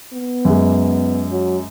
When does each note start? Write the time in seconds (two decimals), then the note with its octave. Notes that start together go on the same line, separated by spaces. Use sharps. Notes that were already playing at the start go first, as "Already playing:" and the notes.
0.13 B3
0.45 F#2 G#3
1.31 F#3